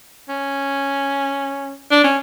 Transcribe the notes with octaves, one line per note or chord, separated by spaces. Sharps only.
C#4
D4
C#4